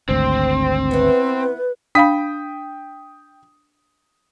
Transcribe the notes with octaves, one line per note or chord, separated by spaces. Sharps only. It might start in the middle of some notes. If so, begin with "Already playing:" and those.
G#1 D2 C4
E3 B3 B4
D4 F5 G5 B5 D#6 B6